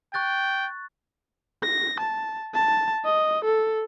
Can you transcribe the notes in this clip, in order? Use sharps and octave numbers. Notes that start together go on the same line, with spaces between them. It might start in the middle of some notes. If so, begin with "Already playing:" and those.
G5 C#6 F#6 A6
A#6
A5
A5
D#5
A4